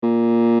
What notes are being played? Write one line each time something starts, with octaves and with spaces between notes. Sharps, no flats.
A#2